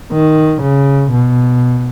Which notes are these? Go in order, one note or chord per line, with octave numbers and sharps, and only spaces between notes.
D#3
C#3
B2